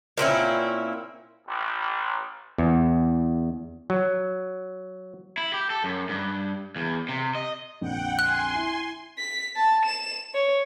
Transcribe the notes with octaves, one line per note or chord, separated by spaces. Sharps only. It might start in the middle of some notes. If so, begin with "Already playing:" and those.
A#2 C4 C#4 E4
A1
E2
F#3
E4
G4
A4
F#2
G2
E2
C3
D#5
A#1 F2 D3 F#5 G5
G#5 C6 F#6
E4
B6
A5
E7
C#5